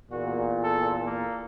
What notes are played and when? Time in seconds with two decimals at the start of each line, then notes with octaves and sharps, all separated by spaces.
0.12 E2 A#2 F#4
0.64 A4
1.06 A#3